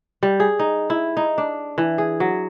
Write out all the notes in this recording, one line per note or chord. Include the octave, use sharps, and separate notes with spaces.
G3
G#4
D#4
E4
D#4
D4
E3
G#4
F#3